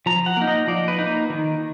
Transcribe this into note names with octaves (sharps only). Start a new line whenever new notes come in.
F3 A#5
F#5
A#3 D#4
D#5
F3 D5
B4
A#3 D#4
D#3